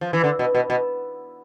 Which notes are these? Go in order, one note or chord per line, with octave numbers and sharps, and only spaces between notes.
F3
E3
D3
B2
B2
B2